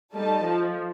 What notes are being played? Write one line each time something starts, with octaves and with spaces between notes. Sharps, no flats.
G3 A3 D#4 A4 D#5 A5
F3